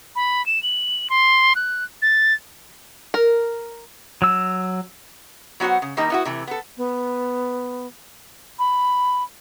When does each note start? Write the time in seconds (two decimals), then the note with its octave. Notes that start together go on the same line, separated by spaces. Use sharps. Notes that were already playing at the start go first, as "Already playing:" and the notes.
0.16 B5
0.46 E7
0.63 F#7
1.10 C6
1.56 F#6
2.02 A6
3.14 A#4
4.22 F#3 E6
5.60 F#3 B3 F#4 C5 F#5
5.82 C#3
5.97 D#3 G3 A#3 D#4
6.10 B3 E4 F#4
6.25 C3 E3 A3
6.47 B3 A4
6.77 B3
8.59 B5